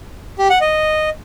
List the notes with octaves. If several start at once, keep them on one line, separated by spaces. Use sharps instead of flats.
G4
F#5
D#5